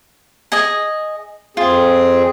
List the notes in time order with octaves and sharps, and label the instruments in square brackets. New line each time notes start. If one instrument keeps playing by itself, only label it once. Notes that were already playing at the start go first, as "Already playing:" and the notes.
[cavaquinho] G#4 D#5 G#5
[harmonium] F2 C4 G#4 [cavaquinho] F4